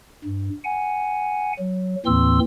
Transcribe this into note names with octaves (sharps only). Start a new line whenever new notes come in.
G2
F#5 G#5
F#3
D#2 A2 E3 C4 C6 E6